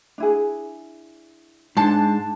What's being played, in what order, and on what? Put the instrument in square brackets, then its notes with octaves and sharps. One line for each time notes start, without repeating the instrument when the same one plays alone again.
[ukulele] D4 E4 G#4
[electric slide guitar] G#2 [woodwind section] D4 [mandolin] A5 C6